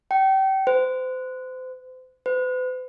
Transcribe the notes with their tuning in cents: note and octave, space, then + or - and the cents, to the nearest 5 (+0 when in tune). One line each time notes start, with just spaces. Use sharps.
G5 -30
C5 -35
B4 +45